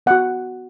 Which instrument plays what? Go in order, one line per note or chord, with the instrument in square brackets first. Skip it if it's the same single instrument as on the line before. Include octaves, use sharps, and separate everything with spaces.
[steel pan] B3 F#4 F#5